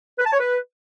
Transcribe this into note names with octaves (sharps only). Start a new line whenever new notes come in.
B4
A5
C#5
B4